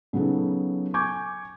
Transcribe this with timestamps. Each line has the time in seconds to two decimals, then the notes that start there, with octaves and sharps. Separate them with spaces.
0.13 C#3 F#3 B3 D#4 A4
0.94 G#5 C#6 D6 G6 G#6